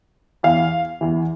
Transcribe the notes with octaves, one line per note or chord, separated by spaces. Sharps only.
E2 E3 F5
E2 E3